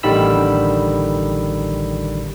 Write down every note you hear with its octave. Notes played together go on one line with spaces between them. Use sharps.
A1 D3 D#3 G3 B5 E6